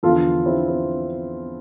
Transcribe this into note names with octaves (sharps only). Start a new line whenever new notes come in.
E2 D3 F3 F4 A4
C4 E4
C4